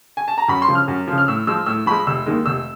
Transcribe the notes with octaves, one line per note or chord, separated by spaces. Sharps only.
G#5
A5
A#5
F#2 B5
C6
C#3 F3
F6
F#2
C#3 F3
F6
A2 E6
F3 G#3 E6
A2 E6
F3 G#3 B5
F1 E6
D#2 D#3 G#3
F1 E6